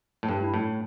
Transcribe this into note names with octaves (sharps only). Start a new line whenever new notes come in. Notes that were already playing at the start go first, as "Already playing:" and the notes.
A2
G2 D4
E4
A2 D4